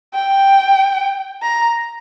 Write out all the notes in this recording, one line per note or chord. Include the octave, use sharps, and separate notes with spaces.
G5
A#5